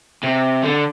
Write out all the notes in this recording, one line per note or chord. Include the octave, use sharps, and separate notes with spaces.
C3
D3